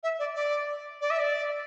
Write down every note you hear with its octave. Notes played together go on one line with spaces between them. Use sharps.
E5
D5
D5
D5
E5
D5